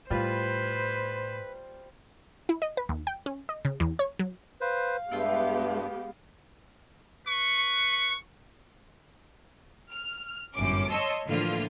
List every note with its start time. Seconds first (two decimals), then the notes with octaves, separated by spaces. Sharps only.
0.10 A2 G3 F4 B4 C5
2.49 E4
2.62 D#5
2.77 B4
2.89 D#2
3.07 G5
3.26 C#4
3.49 D#5
3.65 C#3
3.80 E2
3.99 C#5
4.19 F#3
4.61 B4 C5 F5
5.11 G2 G#3 B3 E4 F4 G4
7.27 B4 C#6
9.91 F6
10.55 G1 F#2 A2 C#4 D6
10.90 C#5 D#5 A5 C6 E6
11.27 A2 D3 E3 F3 A#3 F4